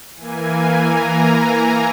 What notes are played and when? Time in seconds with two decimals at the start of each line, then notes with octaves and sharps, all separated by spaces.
0.16 E3 A#3 G#5
0.77 A#5